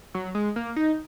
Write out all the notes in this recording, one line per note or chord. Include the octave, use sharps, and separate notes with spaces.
F#3
G#3
A#3
D#4